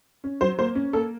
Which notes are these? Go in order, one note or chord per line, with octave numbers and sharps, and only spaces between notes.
C#4
F#3 C5
A#3 C5
C#4
A#3 A4